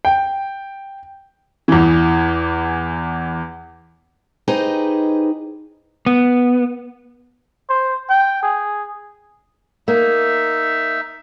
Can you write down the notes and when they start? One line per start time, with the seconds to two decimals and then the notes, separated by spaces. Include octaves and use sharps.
0.05 G5
1.68 E2 E3
4.48 D#4 G4 G#4 B4 C5 D#5
6.06 B3
7.69 C5
8.09 G5
8.43 G#4
9.88 A#3 D#4 E5